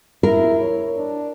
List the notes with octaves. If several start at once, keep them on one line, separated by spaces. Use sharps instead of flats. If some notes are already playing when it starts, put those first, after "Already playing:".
E4 A#4
C#5
D4